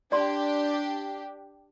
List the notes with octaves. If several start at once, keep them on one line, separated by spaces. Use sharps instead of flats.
D4 G4 D5 C6